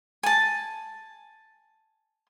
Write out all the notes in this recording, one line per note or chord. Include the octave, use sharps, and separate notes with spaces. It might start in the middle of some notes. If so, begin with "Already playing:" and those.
G#5 A5